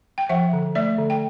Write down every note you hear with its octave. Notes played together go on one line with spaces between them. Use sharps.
G5
F3 E5 F#5
D3
A3 D5 E5
D3
G5